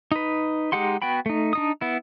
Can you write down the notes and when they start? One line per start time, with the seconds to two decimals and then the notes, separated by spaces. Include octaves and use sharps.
0.12 D#4 B4
0.72 G#3 D#4 G4 F#5 C6
1.02 B3 F#4 G5 B5
1.26 A3 D#4
1.53 D4 D#4 D#6
1.81 B3 E4